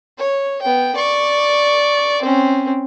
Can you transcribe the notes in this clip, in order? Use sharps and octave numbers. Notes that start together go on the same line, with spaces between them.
C#5
B3 G5
D5 C#6
C4 C#4